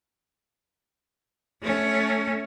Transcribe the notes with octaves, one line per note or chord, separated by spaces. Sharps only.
A3 C#4